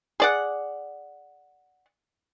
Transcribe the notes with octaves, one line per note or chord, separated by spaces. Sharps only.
G#4 D5 F#5